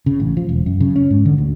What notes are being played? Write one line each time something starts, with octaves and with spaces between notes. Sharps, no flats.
C#3
A1
F3
E1
F#2
C#3
C#4
G#2
D3
D2